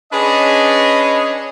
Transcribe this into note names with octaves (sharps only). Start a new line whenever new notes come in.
C#4 D4 G#4 B4 C#5 D#5